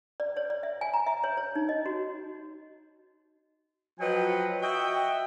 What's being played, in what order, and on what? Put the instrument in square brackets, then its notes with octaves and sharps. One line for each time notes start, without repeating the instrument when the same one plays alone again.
[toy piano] D5
C#5
D5
E5
G#5
A#5
E5
C#5
C#5
D#4
D#5
F#4
[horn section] F3 F#3 B4 D#5 G5
F#4 D#5 E5 G5